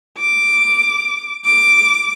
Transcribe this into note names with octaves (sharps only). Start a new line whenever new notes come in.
D6
D6